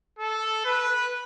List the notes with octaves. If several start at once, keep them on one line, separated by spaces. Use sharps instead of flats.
A4
B4